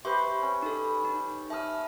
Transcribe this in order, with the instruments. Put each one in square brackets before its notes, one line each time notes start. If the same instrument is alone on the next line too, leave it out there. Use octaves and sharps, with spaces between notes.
[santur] G4 B4 C5 [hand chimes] E5 C6 C#6
[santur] C#4
[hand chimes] D#4 A4
D#4
[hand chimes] E5 F6 [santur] A5 D#6